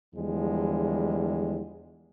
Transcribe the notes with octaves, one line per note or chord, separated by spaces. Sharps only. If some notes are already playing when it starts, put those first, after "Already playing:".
E2 D3 F3 G3 G#3